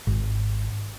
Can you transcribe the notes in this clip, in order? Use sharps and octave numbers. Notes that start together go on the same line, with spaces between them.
G#1